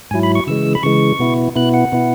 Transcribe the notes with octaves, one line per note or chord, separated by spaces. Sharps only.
G#2 F#3 E4 G#5
B5
C#6
C#3 E3 G#3 E6
B5
C#3 E3 G#3 C#6
B2 B3 E4
B2 B3 E4 F#6
F#5
B2 B3 E4